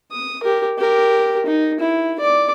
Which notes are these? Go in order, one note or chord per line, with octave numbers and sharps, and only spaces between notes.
D#6
G4 A#4
G4 A#4
D#4
E4
D5 D6